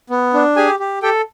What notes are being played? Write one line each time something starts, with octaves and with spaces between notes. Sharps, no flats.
B3
D4
G4 G#4 G#5
G4
G4 A4 G5